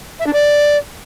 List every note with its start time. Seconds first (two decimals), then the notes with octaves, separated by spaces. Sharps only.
0.20 E5
0.27 D4
0.33 D5